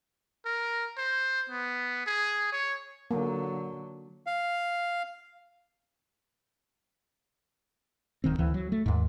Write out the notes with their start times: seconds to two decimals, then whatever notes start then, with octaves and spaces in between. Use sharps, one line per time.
0.45 A#4
0.98 C5
1.50 B3
2.07 G#4
2.52 C#5
3.11 D3 F#3 A#3
4.26 F5
8.24 D1 D#3 C4
8.38 D2 E3
8.54 F#3
8.72 A3
8.86 D#2 G#2